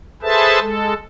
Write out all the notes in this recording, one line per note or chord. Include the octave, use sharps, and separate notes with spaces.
G#4 A4 B4 C5 E5 A5
G#3 A4